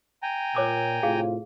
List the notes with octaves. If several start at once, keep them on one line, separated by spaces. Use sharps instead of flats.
G5 G#5 A#5
A#2 C#5 D6 E6
A2 C3 F4 G#4 F5